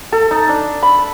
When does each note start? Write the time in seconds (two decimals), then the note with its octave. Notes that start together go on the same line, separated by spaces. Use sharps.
0.12 A4
0.31 D#4
0.49 D4
0.83 B5